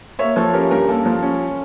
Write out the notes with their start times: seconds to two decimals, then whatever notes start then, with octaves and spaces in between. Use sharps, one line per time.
0.19 A#3 C#5 E5
0.36 F3 A4 C#5
0.53 C#4 G4 A#4
0.71 G2 G4 A#4
0.88 A#3 A4
1.06 F3
1.23 C#4